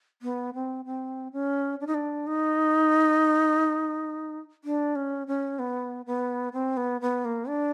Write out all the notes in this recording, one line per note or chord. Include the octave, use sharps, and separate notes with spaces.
B3
C4
C4
C#4
D4
D#4
D4
D#4
D4
C#4
C#4
B3
B3
C4
B3
B3
A#3
D4